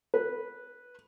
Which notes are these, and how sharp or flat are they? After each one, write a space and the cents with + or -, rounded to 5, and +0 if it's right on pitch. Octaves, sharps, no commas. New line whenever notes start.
B4 -10